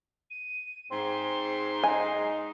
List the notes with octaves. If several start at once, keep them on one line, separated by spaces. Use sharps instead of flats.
D#7
G#2 C4 C6
D#4 G#5